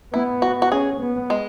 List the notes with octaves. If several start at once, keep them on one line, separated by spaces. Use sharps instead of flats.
B3 E4
F#4
F#4
C#4 G#4
B3
G#3